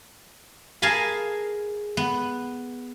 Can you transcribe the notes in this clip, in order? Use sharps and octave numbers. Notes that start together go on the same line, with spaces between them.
G#4 A#4 F5 G#5 A5 B5
B3